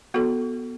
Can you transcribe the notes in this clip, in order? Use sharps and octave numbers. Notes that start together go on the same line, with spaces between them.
B3 F#4 A4